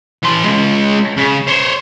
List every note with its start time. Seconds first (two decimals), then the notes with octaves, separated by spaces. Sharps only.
0.23 E3 C6
0.45 G#3 C#4
1.17 C#3
1.48 C5 C#5